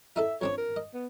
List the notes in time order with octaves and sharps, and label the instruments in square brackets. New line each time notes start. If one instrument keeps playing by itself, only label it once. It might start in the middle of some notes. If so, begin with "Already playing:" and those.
[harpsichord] D#4 E4 A4 [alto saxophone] E5
[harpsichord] F2 C4 D4 [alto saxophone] C#5
[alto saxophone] A#4
[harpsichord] D#5
[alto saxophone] B3